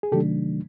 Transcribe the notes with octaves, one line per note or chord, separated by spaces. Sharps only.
G#4
C3 D#3 F#3 A3 D4 G4 A4